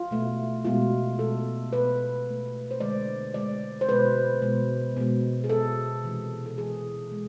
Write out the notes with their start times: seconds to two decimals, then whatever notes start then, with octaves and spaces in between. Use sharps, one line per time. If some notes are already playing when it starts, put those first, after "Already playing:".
Already playing: F4
0.11 B2 A3
0.65 B2 G#3 F4
1.19 B2 G#3 A4
1.73 B2 A3 B4
2.26 B2 A3
2.71 C5
2.80 D3 G#3 D5
3.34 D3 G#3 D5
3.81 C5
3.88 B2 G#3 B4
4.42 B2 G#3
4.97 B2 G#3
5.44 G#4
5.50 B2 G#3 A4
6.04 C3 E3 G#3
6.46 A4
6.58 C3 E3 G#3 G#4
7.12 G#3